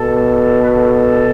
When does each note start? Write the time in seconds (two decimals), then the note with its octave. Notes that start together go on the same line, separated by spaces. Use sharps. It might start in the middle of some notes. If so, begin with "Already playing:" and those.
Already playing: B2 A4
0.62 B4
0.72 A4